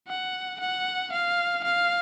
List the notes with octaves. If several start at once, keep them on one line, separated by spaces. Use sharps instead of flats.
F#5
F#5
F5
F5